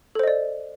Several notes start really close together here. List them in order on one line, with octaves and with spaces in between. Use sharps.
A4 C5 D#5 D5